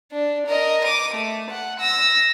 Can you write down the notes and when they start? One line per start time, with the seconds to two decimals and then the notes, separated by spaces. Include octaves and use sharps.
0.12 D4
0.47 A#4 D#5
0.85 D6 D#7
1.14 A3
1.50 F#5
1.80 E6 A#6